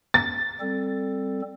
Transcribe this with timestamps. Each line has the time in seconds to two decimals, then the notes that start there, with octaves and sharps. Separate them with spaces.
0.14 A6
0.60 G3 C4 A4